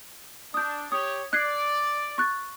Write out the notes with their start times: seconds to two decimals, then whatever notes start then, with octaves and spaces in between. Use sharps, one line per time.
0.54 D4 D#6 G6
0.92 G4 C#5 D#6
1.33 D5 F#6 G#6 C7
2.18 C#6 F#6 A6